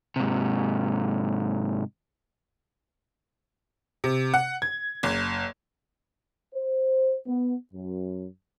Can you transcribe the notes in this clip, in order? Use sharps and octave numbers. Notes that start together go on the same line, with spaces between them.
G#2 C3
C3
F#5
G#6
F#1
C5
B3
F#2